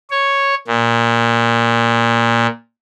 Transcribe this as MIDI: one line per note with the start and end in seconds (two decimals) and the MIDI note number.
0.10 0.54 73
0.67 2.47 46